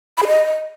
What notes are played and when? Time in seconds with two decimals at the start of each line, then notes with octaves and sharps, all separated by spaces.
0.17 B5
0.22 G#4
0.27 D#5